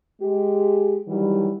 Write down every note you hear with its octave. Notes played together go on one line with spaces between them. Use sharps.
G#3 G4
D#3 E3 F#3 G3